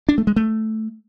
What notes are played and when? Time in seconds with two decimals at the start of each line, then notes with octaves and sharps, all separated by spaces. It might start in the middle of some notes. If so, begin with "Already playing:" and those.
0.09 D4
0.18 A3
0.27 G#3
0.36 A3